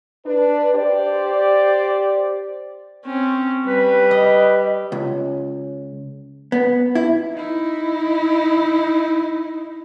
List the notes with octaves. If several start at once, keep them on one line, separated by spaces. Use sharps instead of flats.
D4 B4
G4 C5 D5
C4 C#4
G3 B4
D#5
C#2
B3
E4
D#4 E4